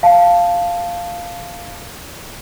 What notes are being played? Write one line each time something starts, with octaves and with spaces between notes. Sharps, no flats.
F5 A5